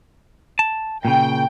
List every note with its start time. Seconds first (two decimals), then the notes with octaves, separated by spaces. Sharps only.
0.59 A5
1.05 A#2 C#3 G5